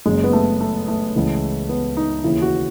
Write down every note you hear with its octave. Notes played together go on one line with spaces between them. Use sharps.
F#1 F#2 C#3 G#3
B3
A3
A3
A3
C#2 C#3 E3
B3
D#4
D#2 C#3 E3 E4
F#4